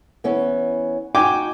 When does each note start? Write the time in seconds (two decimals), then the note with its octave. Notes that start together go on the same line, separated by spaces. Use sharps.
0.24 E3 B3 C#4
1.15 D#4 F#4 G5 G#5 D6